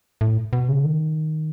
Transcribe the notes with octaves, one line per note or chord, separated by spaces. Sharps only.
A2
B2
C#3
D#3